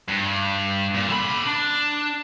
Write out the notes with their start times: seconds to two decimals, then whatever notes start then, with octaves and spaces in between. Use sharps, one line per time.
0.08 G2
0.94 A#2
1.08 D3 B5
1.46 D4